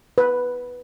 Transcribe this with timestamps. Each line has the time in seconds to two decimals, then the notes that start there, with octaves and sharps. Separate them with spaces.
0.18 B4